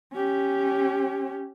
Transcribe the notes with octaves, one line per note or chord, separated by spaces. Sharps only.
C#4 G4